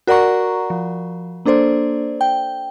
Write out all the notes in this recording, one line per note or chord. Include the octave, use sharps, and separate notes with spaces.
F#4 A#4 D5 F#5 A#5 C#6
F3
A#3 D4 A4 C5 D5
G5